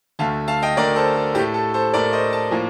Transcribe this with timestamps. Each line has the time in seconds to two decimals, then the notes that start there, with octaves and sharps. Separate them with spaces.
0.19 D2 D3 A3 F5 A5
0.48 F5 A5
0.62 D#5 G5
0.77 D2 D3 A3 A#4 D5
0.96 A4 C5
1.16 A4
1.35 A2 G4
1.39 A3
1.54 A4
1.74 A4 C5
1.93 A2 A3 A#4 D5
2.13 C5 D#5
2.33 A5
2.51 A2 F3 A#3